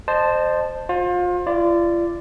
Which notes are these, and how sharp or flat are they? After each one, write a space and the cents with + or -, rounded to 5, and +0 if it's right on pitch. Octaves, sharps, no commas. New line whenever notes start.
C5 +0 D#5 -35 A5 +0
F4 +30 C5 +30
F4 -40 D5 +0